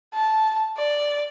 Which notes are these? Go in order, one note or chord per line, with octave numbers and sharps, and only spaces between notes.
A5
D5